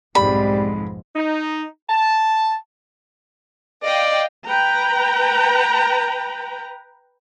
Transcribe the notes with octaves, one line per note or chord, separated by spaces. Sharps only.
B1 F2 G#2 G3 B5
D#4
A5
D5 D#5 F5 G5
B4 G5 A#5